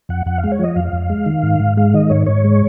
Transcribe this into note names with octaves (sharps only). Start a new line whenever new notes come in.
F2 F#5
F2 F#5
F5
G#3
C#5
F3 D#5
F2 F5
F2
G#3
D#3
G#2
G#2
G#3 F5
D#3 D#5
G#2 C#5
G#2 C#5
G#3